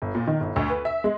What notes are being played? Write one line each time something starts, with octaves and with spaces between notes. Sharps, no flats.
G1
A#2
D#3
G1
D2
B4
E5
G#3